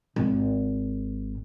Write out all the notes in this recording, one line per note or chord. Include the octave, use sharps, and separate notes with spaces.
G#1